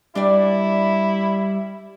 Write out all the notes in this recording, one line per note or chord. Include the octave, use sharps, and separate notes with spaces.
G3 D4 E4 B4 D5